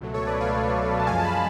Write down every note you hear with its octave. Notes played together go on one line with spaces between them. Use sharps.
C#2 B2 F#3 A3
A4 C#5
B4 D5
C#5 F5
A5
F#2 F3 G#3 F5 G#5
A5
G#5 B5